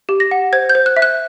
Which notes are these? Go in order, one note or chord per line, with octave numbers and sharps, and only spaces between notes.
G4
A#6
F#5
C5 G#6
G6
C5
F#6
E5
F#6